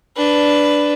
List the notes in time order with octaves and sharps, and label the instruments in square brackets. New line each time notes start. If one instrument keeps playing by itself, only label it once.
[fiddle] D4 B4